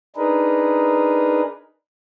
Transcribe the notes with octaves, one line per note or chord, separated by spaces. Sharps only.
D4 D#4 G#4 A#4 B4